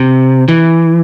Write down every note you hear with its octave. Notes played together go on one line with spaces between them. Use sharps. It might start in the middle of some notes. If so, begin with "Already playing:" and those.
Already playing: C3
E3